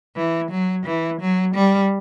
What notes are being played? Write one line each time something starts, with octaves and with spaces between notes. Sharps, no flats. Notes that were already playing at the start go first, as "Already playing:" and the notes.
E3
F#3
E3
F#3
G3